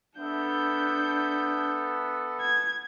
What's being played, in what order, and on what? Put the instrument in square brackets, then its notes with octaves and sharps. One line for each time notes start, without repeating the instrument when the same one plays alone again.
[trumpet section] B3 A4 E5 [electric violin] D4 G6
[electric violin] G#6